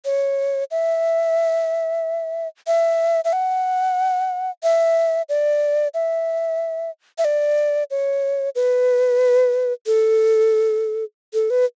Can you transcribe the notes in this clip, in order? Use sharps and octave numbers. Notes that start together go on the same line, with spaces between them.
C#5
E5
E5
E5
F#5
E5
D5
E5
E5
D5
C#5
B4
A4
A4
B4